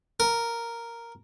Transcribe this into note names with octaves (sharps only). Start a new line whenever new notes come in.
A#4